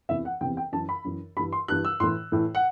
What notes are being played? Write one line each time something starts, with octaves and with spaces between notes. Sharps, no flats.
E2 C3 E3 E5
F#5
E2 C3 E3 G5
G5
F#2 E3 A5
B5
F#2 E3
G2 E3 B5
C6
G2 E3 F#6
E6
A2 E3 C6
A2 E3
F#5